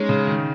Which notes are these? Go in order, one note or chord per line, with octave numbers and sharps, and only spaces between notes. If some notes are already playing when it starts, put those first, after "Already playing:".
Already playing: G#3 C#4 D#4
C#3
D#3